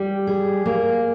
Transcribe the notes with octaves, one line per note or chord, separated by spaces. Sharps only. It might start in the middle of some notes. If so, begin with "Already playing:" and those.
Already playing: G3
G#4
A#3